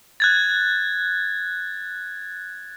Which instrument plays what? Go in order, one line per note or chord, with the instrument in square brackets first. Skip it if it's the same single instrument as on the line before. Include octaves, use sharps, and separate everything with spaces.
[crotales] F#6 G#6 A6